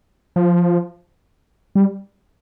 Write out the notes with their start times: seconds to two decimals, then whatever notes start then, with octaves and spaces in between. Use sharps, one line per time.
0.36 F3
1.75 G3